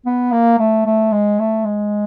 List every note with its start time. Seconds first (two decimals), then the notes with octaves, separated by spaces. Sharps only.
0.06 B3
0.32 A#3
0.59 A3
0.86 A3
1.12 G#3
1.39 A3
1.65 G#3